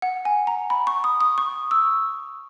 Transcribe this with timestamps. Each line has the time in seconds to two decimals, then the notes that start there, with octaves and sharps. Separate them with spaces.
0.02 F#5
0.25 G#5
0.47 A#5
0.70 B5
0.87 C#6
1.04 D#6
1.21 D#6
1.38 C#6
1.71 E6